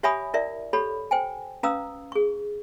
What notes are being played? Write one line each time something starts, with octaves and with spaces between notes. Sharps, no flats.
G4 C#5 E5 G#5 B5 D#6
E4 A#4 D5 E5
G4 A4 C#5 B5
C5 G5 G#5
C#4 B4 F5 A#5 D#6 E6
G#4 C#6